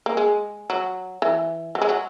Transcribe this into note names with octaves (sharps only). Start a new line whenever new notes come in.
A#3
G#3
F#3
E3
F#3
G#3
F#3